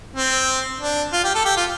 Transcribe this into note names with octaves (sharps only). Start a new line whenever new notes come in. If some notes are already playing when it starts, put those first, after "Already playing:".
C4
D4
F4
G4
A4
G4
F4